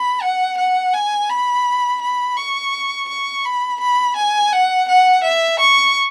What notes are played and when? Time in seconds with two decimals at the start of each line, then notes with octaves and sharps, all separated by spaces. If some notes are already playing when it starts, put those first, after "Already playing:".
Already playing: B5
0.22 F#5
0.57 F#5
0.93 G#5
1.29 B5
2.01 B5
2.37 C#6
3.09 C#6
3.45 B5
3.80 B5
4.16 G#5
4.52 F#5
4.88 F#5
5.24 E5
5.60 C#6